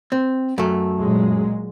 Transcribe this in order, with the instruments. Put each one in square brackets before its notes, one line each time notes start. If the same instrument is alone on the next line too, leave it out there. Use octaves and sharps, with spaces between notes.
[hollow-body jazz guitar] C4
F#2 A3
[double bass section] A#2 F#3 G#3